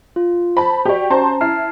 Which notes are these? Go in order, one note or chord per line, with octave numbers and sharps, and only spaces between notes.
F4
C5 A5 B5
F#4 G4 D5 G5 C#6
C#4 C5 A5 A#5 C6
E4 A5 F6 C7